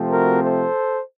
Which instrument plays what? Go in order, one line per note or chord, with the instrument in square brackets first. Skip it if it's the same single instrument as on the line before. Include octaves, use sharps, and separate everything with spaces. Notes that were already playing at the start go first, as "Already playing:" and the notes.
Already playing: [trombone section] C3 F3 A3 C4
F#4 A#4
A4 C5